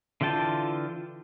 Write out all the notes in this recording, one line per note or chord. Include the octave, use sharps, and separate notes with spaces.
D3 E3 F4 G5 A5